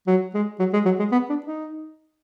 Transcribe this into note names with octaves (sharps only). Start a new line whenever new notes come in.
F#3
G#3
F#3
G#3
F#3
G#3
B3
D4
D#4